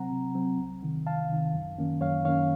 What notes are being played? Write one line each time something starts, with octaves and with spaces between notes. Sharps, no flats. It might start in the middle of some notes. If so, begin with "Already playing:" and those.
Already playing: C3 F#3 C4 F#5 A#5
C3
F#3 C4
C2
C3 D#3
C2 F5 A5
C3 D#3
F#2
D#3 A#3 C#4
F#2 C#5 F5
D#3 A#3 C#4 C#5 F5